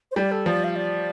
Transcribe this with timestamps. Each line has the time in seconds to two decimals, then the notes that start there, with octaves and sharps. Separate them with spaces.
0.11 C5
0.16 G3 D5
0.32 A4
0.46 F3 D5
0.64 F5
0.76 D5